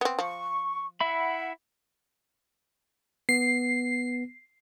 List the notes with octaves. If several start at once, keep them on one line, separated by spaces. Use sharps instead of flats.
B3 C4
F3 C#6
E4 E5 F#5 B5
B3 C7